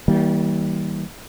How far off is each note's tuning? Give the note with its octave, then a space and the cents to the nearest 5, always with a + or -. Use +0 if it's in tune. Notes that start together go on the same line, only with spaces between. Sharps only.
D#3 +40 G3 -30 A#3 +0